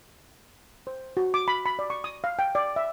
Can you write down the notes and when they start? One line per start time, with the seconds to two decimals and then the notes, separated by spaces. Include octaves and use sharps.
0.87 C5
1.17 F#4
1.34 D6
1.48 B5
1.66 B5
1.79 D5
1.90 C#6
2.04 D#6
2.24 F5
2.39 G5
2.55 D5
2.76 E5